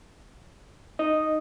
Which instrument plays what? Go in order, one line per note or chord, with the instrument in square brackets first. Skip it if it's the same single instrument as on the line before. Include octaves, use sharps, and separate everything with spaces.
[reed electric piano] D#4 D#5